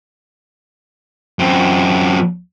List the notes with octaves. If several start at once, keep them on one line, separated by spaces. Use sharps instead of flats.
F#2 C4